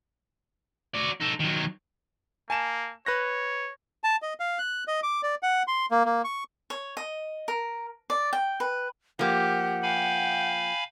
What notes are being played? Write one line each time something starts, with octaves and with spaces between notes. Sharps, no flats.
F#4 D5
D#4 A4
D#3 F#3
A#3 G#5 A5 E7
B4 C#5 F#6 A#6
A5
D#5
F5
F#6
D#5
D6
D5
F#5
C6
A#3
A#3
C#6
C#5
D#5
A#4
D5
G5
B4
F3 A#3 G4 F#5
F5 G5 G#5 B5